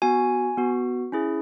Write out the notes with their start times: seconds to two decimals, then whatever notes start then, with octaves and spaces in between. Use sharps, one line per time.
0.02 B3 F#4 G#5
0.57 B3 F#4
1.12 C#4 E4 G#4